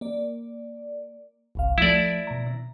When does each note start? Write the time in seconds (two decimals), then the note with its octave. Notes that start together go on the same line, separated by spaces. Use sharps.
0.01 A#3 D5
1.55 G1 C2 F5
1.78 F3 A3 E4 D5
2.27 B2 A#5